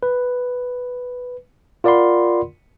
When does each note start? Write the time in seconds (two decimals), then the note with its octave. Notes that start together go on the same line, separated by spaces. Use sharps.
0.03 B4
1.84 F4 A#4 D5 F#5 B5 C6